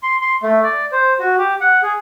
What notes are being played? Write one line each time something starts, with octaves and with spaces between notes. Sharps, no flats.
C6
C6
A3
D5
C5
F#4
G4
F#5
G#4